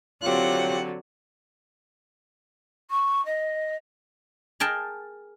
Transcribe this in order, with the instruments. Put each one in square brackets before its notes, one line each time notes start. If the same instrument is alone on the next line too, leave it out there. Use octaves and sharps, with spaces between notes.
[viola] D3 F#3 [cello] C4 F#5 [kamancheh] F4 G4 [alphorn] C#5
[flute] C#6
D#5
[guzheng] G#4 A#4 G5 A5